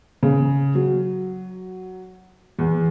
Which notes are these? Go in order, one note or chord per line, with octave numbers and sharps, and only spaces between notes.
C#3
F#3
E2